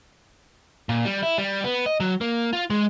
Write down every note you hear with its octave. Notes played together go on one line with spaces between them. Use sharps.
A#2
G3
E4
G3
B3
D#5
F#3
A#3
F4
G#3